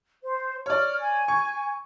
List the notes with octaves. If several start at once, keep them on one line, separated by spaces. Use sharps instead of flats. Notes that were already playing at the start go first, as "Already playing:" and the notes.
C5
C#5 D5 F6
G#5
C#6